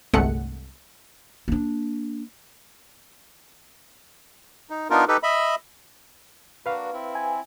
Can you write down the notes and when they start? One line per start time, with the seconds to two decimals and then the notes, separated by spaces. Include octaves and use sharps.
0.14 G1 C2 G#3 A3 F#5 C#7
1.48 A#3 D4
4.70 D#4
4.90 B3 D4 D#4 F4 A#4
5.08 D#4 G4 A4 B4
5.23 D#5 E5 B5
6.66 A#3 D4 F#4 B4 F5
6.93 C4 E4
7.15 G#5